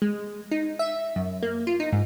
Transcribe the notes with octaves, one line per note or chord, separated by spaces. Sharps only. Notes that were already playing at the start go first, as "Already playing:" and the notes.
G#3
D#4
E5
F#2
A#3
F4
D#4
G#2